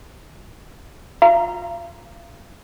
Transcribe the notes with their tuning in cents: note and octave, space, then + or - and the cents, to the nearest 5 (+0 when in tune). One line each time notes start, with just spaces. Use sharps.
F4 +30 F5 -35 A#5 +0